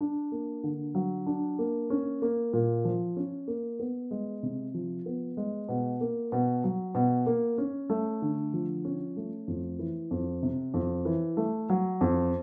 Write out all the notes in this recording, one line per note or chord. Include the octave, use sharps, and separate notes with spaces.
D4
A#3
D3
F#3
D4
A#3
C#4
A#3
A#2
F3
C#4
A#3
B3
G#3
C3
F3
B3
G#3
B2
A#3
B2
F#3
B2
A#3
C#4
A3
D3
F3
C#4
A3
F2
E3
F2
C3
F2
E3
A3
F#3
F2